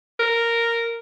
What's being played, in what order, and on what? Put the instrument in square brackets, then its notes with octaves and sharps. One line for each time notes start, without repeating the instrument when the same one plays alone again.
[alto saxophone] A#4